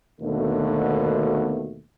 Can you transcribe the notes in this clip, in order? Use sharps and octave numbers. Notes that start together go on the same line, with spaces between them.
D#2 B2 D3 A3